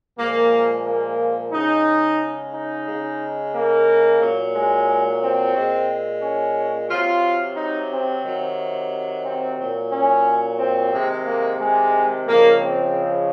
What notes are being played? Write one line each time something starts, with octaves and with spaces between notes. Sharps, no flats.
A#2 F3 G#3 A#3
A#3
C#3 G#3 D#4
D#4
C#3 G#3
A#3
A#2 F#3
G#3
C4
A#2 G#3
C#4
C3 F#3 F4
D#4
C4
C3 D#3 F#3
C4
A#2 F#3
C#4
C4
C3 D#3 G#3
A#3
G#3
C#3 F3 G#3 A#3
C4